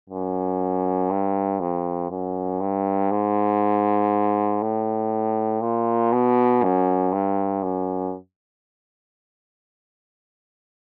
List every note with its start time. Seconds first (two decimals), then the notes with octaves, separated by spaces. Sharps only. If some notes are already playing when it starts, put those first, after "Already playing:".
0.10 F#2
1.11 G2
1.60 F2
2.11 F#2
2.61 G2
3.11 G#2
4.62 A2
5.62 A#2
6.12 B2
6.63 F#2
7.12 G2
7.63 F#2